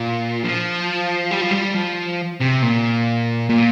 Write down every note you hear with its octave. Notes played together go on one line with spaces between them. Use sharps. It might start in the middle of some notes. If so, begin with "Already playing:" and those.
Already playing: A#2
F3
G3
F3
G3
F3
C3
A#2
A#2